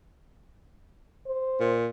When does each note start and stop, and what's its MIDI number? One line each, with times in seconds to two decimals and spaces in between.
1.27 1.77 72
1.60 1.88 46